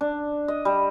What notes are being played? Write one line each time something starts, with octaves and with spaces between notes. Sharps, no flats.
D4
D#5
G3